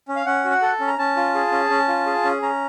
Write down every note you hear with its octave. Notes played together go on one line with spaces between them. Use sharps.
C#4
F5
C#4 F#5
F#4
F#5
A4
C#4
A#5
C#4 A5
F4
G#4
C#4
C#4
F4
G#4
C#4
C#4 A#5